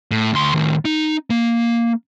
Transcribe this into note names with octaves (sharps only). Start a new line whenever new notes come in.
A2
D2 C6
A2 D#3
D#4
A#3